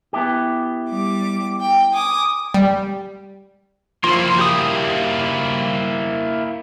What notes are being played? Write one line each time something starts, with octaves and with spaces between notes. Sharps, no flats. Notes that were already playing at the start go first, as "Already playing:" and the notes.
B3 E4 G4
G3 D6
G5
G#5 D6 D#6
G3
F3 A#3 E4 F4 C6
G4 D#6